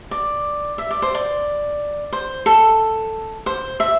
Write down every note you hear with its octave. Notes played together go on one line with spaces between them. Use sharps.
D5
E5
D5
C5
D5
C5
A4
C5
E5